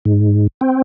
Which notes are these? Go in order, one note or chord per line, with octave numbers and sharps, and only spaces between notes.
G#2
C4